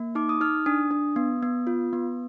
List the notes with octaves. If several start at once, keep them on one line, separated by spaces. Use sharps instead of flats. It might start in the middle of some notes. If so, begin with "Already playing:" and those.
Already playing: A#3
D#4 D6
D#6
D#4 F6
D4 D#6
D4
B3
B3
F4
B3